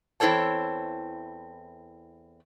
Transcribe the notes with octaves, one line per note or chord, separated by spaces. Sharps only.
E2 C4 E4 A4 C#5 A5